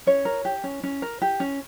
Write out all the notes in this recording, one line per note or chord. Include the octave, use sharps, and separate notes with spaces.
C#4 C#5
A#4
G4
C#4
C#4
A#4
G4
C#4